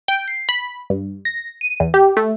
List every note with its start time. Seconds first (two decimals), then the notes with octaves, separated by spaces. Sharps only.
0.08 G5
0.28 C7
0.49 B5
0.90 G2
1.25 A#6
1.61 D#7
1.80 E2
1.94 G4
2.17 A3